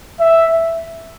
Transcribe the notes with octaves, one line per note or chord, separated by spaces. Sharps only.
E5